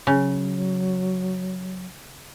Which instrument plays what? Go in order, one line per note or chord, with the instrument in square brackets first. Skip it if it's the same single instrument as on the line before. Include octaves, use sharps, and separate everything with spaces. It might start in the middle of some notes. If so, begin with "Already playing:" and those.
[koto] C#3 [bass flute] F#3